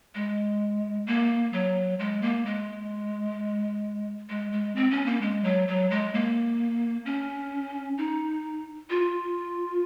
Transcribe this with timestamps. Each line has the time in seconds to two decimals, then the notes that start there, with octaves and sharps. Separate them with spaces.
0.15 G#3
1.07 A#3
1.53 F#3
1.99 G#3
2.22 A#3
2.46 G#3
4.30 G#3
4.52 G#3
4.76 C4
4.91 C#4
5.06 A#3
5.21 G#3
5.44 F#3
5.68 F#3
5.90 G#3
6.14 A#3
7.06 C#4
7.98 D#4
8.90 F4